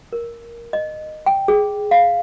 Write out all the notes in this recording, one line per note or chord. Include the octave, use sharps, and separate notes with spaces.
A#4
D#5
G5
G#4
F5